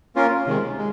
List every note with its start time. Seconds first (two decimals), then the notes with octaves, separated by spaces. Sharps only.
0.16 A#3 C#4 F4 A#4
0.46 C3 D#3 G#3
0.77 G#3